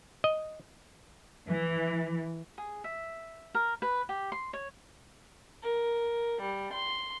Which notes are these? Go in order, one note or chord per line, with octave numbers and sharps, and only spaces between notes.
D#5
E3
G#4
E5
A#4
B4
G4
C6
C#5
A#4
G3
C6